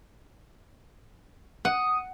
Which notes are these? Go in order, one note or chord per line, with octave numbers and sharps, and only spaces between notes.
F#5 D#6